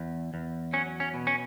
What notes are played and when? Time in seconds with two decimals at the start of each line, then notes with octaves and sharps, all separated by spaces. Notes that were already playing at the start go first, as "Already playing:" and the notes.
Already playing: E2
0.34 E2
0.73 F#3 C#4
1.00 C#4
1.14 B2
1.27 C#4